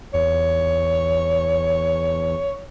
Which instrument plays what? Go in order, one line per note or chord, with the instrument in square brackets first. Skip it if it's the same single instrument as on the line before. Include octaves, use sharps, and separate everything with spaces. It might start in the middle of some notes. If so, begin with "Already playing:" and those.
[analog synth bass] E2 [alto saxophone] C#5